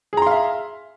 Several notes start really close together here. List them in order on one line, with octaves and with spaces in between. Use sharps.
G#4 A#5 C6 F5 E5